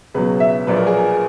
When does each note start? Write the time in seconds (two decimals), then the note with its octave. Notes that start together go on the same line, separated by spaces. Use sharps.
0.14 C#2 B2 F#3 B4
0.40 E5
0.66 A#1 A#2 F#3 B4
0.77 A#4
0.87 G#4
0.97 A#4